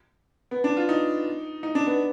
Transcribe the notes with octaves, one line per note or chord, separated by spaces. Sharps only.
B3
D4
F4
D#4
D#4
D4
B3